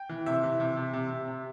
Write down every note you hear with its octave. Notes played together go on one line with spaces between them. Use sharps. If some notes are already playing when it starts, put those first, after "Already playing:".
Already playing: G5
E3
C3 E5
E3
C3
C3
C3
C3
C3